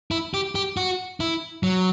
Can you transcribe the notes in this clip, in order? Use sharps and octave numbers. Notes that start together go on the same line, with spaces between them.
E4
G4
G4
F#4
E4
F#3